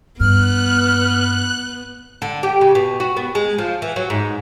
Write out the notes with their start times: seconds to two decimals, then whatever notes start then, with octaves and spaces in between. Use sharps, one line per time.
0.20 G2 B3 F6 F#6
2.22 D3
2.43 G4
2.61 C#3
2.75 B2
3.00 F#4
3.17 B3
3.35 G#3
3.58 F3
3.82 E3
3.96 F#3
4.10 G#2